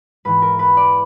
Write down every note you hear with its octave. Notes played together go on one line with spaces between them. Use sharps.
G#2 E3 B4
A#4
B4
D5